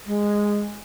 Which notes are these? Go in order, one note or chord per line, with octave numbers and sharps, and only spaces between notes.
G#3